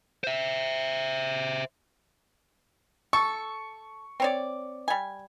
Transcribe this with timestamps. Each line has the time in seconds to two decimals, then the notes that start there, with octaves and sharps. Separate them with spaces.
0.24 C5 E5
3.13 A4 C#6
4.20 C4 C#5 D5
4.88 G3 G#5